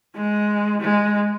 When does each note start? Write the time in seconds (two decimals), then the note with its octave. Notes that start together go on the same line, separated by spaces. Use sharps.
0.15 G#3
0.81 G#3